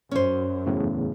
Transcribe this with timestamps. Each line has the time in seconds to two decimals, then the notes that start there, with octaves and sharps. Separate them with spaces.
0.11 F#2 C#4 C5
0.66 E2 A2 C#3